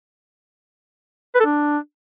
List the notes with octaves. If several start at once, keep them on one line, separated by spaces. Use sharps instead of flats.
B4
A4
D4